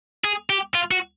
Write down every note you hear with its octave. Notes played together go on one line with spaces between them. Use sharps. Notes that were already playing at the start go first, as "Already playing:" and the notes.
G#4
G4
F4
F#4